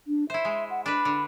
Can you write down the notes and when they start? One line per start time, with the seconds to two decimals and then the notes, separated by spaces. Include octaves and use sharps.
0.07 D4
0.30 E4 C5 E5
0.45 G#3
0.70 F#5
0.86 D4 B4 B5
1.05 D3